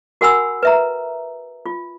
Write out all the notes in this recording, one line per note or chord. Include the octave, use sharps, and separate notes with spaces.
F#4 A#4 F#5 G#5 B5 E6
B4 E5 A#5
F4